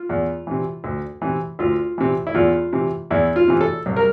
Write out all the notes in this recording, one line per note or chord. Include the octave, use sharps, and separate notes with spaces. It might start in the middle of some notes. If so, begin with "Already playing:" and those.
Already playing: F4
E2
C3 E3
D2
C3 E3
D2 F4
C3 E3
E4
E2 F4
C3 E3
E2 E4
F4
C3 E3
A4
C2
A#4